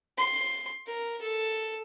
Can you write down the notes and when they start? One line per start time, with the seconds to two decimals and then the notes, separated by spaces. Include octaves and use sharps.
0.18 C6
0.87 A#4
1.22 A4